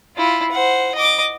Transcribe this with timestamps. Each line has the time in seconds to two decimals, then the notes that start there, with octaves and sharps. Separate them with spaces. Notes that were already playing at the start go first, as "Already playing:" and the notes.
0.16 E4 F4
0.52 C5 F#5
0.95 D#5 D6